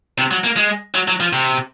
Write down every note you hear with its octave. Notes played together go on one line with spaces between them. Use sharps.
C3
F#3
A#3
G#3
F#3
F#3
F3
C3